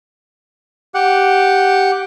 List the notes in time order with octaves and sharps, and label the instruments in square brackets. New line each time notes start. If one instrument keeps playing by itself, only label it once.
[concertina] G4 F#5